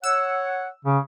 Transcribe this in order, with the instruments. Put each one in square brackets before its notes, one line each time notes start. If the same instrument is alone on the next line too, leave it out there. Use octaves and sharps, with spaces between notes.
[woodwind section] C#5 F#5 [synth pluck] E6
[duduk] C#3